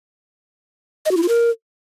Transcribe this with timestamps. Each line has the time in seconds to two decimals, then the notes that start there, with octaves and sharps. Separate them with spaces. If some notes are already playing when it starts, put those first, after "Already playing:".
1.06 D#5
1.11 F#4
1.17 E4
1.23 F4
1.28 A#4